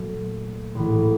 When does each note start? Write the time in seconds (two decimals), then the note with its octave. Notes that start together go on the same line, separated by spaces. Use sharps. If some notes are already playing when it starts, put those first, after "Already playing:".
Already playing: A#2 F#3 A3
0.75 A#1 A2 E3